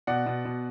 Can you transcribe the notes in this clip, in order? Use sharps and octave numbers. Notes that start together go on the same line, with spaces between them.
B2 D5 F#5
B2
B2